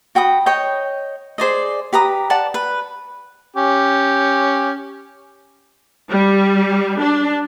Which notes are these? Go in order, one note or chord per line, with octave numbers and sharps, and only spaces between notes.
F#4 G5 B5 D#6
C#5 D#5 G5
G#4 C5 D5 D#5
G4 B4 A#5 D#6
D5 F#5 A5 D6
B4
C#4 G4
G3
D4